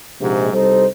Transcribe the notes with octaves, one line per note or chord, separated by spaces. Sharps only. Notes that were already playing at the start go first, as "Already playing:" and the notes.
A#1 G#2 C3
C2 G3 D#4 A4 C5